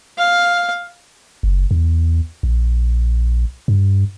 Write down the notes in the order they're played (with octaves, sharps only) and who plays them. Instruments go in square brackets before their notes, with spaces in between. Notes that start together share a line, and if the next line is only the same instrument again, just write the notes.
[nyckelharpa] F5
[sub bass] F#1
E2
A#1
G2